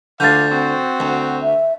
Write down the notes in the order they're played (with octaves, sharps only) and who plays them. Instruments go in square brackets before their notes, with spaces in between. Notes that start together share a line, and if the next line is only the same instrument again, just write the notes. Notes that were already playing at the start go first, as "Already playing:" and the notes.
[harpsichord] D2 D3 [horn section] F4 D5 F5 [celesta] G6 A6
[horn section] C4 F#4
[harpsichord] D2
[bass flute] E5